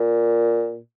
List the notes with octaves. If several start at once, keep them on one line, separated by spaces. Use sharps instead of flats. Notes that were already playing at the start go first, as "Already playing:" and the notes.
Already playing: A#2